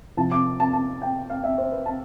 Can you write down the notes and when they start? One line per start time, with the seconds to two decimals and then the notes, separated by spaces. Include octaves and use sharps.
0.17 C3 F3 A5
0.32 D6
0.60 A5
0.73 A5
1.02 G5
1.30 F5
1.44 E5
1.58 C5
1.72 B4
1.86 A5